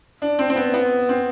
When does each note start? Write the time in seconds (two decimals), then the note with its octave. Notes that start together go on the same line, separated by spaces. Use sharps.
0.22 D4
0.39 C4
0.50 C4
0.56 B3
0.74 B3
1.09 C4